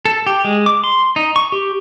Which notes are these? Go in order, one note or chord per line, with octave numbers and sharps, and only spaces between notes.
A4
G4
G#3
D6
C6
D#4
C#6
G4